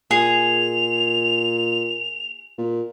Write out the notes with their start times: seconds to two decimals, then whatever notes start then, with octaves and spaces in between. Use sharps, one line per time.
0.11 A#2 G#4 F7
2.58 A#2